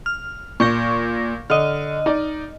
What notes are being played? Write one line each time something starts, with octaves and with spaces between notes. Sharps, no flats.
F6
A#2 C#6 G6 A#6
D3 D#5 F6
D#4 D5